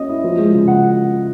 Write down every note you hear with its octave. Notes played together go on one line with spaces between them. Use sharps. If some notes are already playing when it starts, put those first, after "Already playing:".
Already playing: C#4 D#5
E4
F3
G#3
C#3
F#5